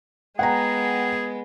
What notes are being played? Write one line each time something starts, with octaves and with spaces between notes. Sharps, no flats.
G#3 B3 G#4 F#5 G5 A#5